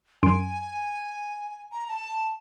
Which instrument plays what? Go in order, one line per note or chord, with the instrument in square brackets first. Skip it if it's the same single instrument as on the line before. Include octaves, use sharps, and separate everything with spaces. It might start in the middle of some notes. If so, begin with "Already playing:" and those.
[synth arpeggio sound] F#2 C6 D7 [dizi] G#5
[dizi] A#5
A5